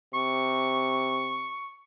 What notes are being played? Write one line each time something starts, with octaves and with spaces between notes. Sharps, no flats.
C3 C#6